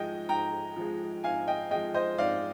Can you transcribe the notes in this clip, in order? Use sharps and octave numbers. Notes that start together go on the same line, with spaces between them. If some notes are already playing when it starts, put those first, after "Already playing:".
Already playing: G#2 F3 G#3 D#5 G5
G#2 G5 A#5
F3 G#3
G#2 F5 G#5
D#5 G5
F3 G#3 D#5 G5
C5 D#5
G#2 D5 F5